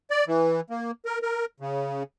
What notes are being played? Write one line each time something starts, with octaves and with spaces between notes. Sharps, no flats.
D5
E3
A#3
A#4
A#4
C#3